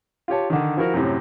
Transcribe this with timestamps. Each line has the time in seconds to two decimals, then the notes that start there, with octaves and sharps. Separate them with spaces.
0.28 F4 G4 C#5 A5
0.50 D3 D#3
0.77 F3 E4 F#4 A#4
0.94 F#2 A2 C3